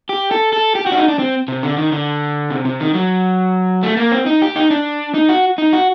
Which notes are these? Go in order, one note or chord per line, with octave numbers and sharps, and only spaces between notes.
G4
A4
A4
G4
F#4
D4
D#4
D4
C4
C3
D3
D#3
D3
C3
C3
D#3
F#3
A3
A#3
C4
D#4
G4
D#4
D4
D#4
F#4
D#4
F#4